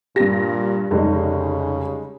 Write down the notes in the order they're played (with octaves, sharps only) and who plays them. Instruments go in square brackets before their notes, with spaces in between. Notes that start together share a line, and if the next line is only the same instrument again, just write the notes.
[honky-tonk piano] G2 A#6 [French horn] A#2 [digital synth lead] G4
[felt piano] F1 [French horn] C#3 [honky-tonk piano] G3 G#3 D#4